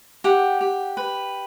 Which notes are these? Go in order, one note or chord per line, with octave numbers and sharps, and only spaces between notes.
G4 F#5
G4
B4